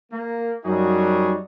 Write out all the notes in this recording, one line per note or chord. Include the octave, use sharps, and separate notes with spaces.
A#3
F#2 F#3 G3 D#4 F#4 G#4